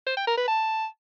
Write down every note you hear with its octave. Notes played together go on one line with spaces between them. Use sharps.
C5
G5
A#4
B4
A5